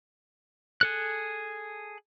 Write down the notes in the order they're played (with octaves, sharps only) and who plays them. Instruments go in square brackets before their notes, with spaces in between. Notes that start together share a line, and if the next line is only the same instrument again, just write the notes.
[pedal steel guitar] G#4 A4 F#6